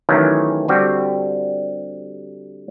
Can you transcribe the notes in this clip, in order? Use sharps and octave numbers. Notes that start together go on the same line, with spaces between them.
D#3 E3 F#3 A3 C#4
D3 G3 C4 F#4 G4